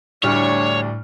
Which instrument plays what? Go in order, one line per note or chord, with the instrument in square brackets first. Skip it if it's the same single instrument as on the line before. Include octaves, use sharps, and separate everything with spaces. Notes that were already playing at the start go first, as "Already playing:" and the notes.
[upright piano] D2 G3 F6 [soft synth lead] A2 [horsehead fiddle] D4 [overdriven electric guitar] C#5